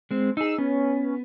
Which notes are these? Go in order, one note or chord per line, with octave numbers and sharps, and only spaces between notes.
G#3 C4
D#4 G#4 E6
B3 C#4